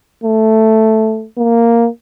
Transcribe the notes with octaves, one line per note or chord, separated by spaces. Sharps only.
A3
A#3